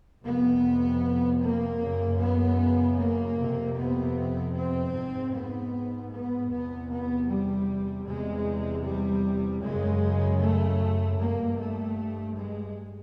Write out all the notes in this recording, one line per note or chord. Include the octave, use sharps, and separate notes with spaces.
F2 C3 B3
A#3
F#2 C#3
B3
A#3
F2 C3
B3
C4
G#2
B3
B3
E2 C3 B3
B3
G3
E2 C3 G#3
G3
F#2 C#3 G#3
A3
G2 A#3
A3
G#3